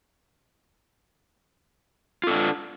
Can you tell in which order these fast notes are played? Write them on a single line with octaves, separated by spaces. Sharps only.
F4 A4 D4